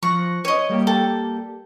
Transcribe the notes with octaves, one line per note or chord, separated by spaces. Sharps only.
F3 C#6 F#6 A#6
C#5 D#5 D#6 D#7
G3 A#3 G4
A4 G5